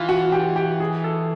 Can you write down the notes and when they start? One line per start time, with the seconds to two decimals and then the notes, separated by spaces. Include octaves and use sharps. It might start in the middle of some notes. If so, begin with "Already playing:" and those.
Already playing: E3 F4
0.09 F#4
0.32 G4
0.56 G4
0.80 G#4
1.04 A4